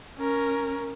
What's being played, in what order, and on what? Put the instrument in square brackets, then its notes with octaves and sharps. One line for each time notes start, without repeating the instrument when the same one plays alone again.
[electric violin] C#4 A#4